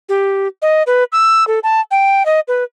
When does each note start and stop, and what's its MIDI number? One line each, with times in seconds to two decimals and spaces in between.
0.09 0.48 67
0.62 0.83 75
0.87 1.04 71
1.12 1.46 88
1.47 1.59 69
1.63 1.81 81
1.91 2.25 79
2.26 2.40 75
2.48 2.64 71